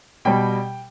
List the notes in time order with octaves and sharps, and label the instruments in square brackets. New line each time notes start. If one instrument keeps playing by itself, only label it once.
[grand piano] B2 G3 G5